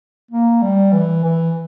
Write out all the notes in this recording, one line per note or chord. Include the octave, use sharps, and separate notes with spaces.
A#3
G3
E3
E3